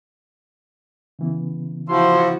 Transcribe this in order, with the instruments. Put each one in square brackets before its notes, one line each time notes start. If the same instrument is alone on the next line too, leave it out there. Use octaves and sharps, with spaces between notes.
[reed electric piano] C#3 E3 B3
[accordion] F3 [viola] E4 F#4 [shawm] C6